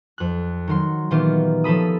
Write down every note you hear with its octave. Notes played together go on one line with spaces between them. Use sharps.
F2 F#6
D#3 F#3 C6
A#2 D#3 E3 B3 F4 G4
F3 C#4 A4 B5 D#6